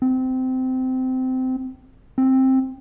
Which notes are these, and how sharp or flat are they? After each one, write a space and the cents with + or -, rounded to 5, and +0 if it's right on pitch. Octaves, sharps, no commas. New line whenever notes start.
C4 -20
C4 +10